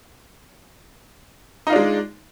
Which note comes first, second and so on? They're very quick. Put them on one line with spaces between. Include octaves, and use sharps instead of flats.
D#4 F4 D4 G#3